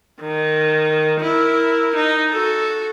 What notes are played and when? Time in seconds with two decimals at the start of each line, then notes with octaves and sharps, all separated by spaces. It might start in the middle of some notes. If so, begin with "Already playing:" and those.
0.20 D#3
1.21 E4 A#4
1.95 D#4
2.31 F#4 A4